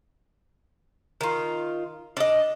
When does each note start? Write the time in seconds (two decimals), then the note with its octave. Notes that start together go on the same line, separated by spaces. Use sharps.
1.21 D#3 F4
2.17 D4 D#5